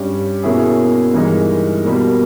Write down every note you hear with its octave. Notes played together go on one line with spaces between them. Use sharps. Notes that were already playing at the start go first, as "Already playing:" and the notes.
Already playing: G2 G3 C#4 G4
B2 A#3 C#4 E4 G#4
G2 E3 G#3 D#4 A#4
B2 G3 A#3